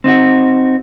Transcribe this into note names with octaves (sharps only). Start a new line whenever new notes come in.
C4 D#4 F4 F#4